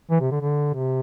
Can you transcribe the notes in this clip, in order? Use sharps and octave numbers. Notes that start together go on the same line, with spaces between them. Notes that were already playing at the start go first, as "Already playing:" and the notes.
E3
C3
D3
D3
C3